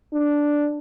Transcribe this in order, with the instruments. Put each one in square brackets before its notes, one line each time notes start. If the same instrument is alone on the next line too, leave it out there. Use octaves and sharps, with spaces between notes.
[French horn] D4